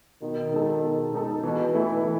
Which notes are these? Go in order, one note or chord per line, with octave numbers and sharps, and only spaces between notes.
B2 D#3
G#3 D#4 A4
B2
G#3 D#4 A4
B2 E3
E3 A3 E4 A4
E3